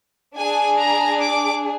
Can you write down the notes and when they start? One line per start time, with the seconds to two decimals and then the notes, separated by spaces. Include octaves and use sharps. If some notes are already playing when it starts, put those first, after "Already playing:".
0.36 D4 G#4 G#5
0.78 A#5
1.20 D6